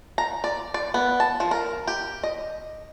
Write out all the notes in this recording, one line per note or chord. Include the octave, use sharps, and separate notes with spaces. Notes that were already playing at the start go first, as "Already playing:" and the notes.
A#5
D5
D5
B3
A5
F3
A#4
G4
D#5